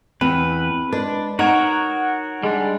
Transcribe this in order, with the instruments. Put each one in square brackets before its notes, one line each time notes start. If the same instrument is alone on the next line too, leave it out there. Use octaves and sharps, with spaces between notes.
[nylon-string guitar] E2 [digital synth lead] C4 [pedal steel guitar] B4
[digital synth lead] G#3 [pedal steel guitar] D4 [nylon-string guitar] B4
[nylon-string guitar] D#4 [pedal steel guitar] F#4 A#4 C#5 [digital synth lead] F#5
[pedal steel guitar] G3 D4 [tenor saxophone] G#3